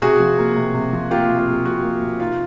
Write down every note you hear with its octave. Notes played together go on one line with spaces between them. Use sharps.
C3 F#4 G#4
F3
A#3
C3
C3
F3
A#3 F4 G4
C3
F4
C3
F3 F#4
A#3
C3
D#4 F4